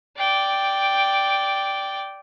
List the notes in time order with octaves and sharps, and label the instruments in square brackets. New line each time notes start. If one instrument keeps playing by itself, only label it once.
[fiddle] D5 G5